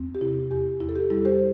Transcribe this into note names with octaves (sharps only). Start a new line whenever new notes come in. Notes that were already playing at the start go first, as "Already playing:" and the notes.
Already playing: E2 C4
G4
C3 E4
E2 G4
E2 E4
A4
G4
G3 E4 A4
G4 C5